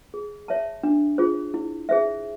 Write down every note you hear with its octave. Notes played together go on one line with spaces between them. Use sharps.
G#4
C#5 E5 A5
D4
F4 G#4 C5
E4
G#4 C5 E5